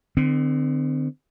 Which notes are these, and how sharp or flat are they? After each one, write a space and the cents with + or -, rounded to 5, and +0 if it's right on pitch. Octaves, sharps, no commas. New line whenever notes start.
D3 +40 C4 -25